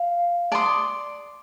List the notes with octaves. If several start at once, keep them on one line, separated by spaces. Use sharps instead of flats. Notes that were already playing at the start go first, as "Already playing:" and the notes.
Already playing: F5
D5 A5 C6 D#6